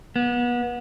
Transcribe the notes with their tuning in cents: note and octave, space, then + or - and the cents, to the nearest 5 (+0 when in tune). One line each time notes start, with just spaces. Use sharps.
B3 -30